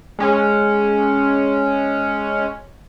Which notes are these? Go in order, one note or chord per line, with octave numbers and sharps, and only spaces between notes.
G#3 C#4